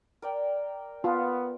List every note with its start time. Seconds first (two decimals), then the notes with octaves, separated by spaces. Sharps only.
0.22 A#4 D5 G5
1.04 B3 F4